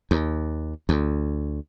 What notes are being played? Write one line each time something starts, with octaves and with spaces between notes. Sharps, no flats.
D#2
D2